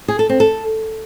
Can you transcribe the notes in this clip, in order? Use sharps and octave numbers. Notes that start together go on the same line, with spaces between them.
G#4
A4
C4
A4